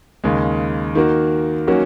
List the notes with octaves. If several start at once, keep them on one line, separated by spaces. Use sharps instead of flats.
D#2 C#3 G#3
D#3 A#3 F#4
D#3 F#3 A#3 C#4 F#4